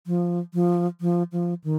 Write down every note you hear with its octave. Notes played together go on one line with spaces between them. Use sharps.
F3
F3
F3
F3
D#3